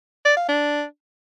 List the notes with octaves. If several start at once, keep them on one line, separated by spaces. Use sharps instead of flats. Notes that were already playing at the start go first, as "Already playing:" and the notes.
D5
F5
D4